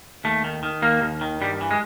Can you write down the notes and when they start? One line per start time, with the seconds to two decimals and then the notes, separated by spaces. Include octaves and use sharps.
0.24 D#2 A3
0.44 D#3
0.63 D#3
0.82 D#2 A#3
1.02 D#2
1.21 D#3
1.41 G2 G3
1.61 E3
1.71 G#3